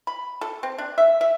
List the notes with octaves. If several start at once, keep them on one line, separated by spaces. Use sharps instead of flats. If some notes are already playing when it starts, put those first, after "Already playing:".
B5
A4
C4
D4
E5
E5